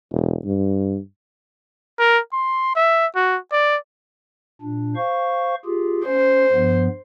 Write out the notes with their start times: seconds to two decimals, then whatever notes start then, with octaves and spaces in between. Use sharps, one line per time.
0.12 E1
0.45 G2
1.99 A#4
2.32 C6
2.75 E5
3.15 F#4
3.52 D5
4.61 A#2 D4
4.96 C5 F5 C#6
5.65 F4 G4 G#4
6.06 C#4 C5
6.52 G2 F3 B3